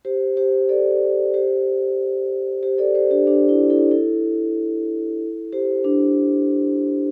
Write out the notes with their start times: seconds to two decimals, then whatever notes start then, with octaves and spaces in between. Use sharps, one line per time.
0.05 G4 C5
0.37 G4 C5
0.69 A4 D5
1.34 G4 C5
2.63 G4 C5
2.78 A4 D5
2.95 G4 C5
3.11 D4 G4
3.27 D4 G4
3.49 E4
3.70 E4 A4
3.91 E4 A4
5.53 G4 C5
5.84 D4